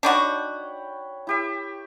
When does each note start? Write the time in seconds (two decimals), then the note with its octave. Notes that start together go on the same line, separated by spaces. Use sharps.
0.03 D4 D#4 F#4 C#5 G5 B5
1.27 E4 G4 E5